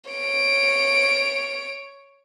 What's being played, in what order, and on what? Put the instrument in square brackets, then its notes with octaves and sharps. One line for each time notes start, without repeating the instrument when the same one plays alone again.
[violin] C#5 D7